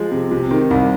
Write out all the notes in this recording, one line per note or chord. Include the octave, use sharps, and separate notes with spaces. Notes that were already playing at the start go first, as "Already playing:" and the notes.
Already playing: F3 G#3
C3
C3
D#3
C2